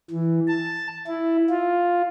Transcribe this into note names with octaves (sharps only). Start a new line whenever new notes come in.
E3
A5
E4
F4